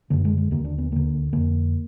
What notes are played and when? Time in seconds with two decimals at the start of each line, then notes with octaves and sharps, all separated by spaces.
0.10 F#2 D3 A#3
0.25 G#3
0.38 G#3
0.51 D#2 D3 A#3
0.64 D4
0.78 B3
0.92 D2 D3 A#3
1.33 F2 D3 A#3